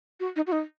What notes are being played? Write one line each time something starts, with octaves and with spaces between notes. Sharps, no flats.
F#4
D#4
F#4
D#4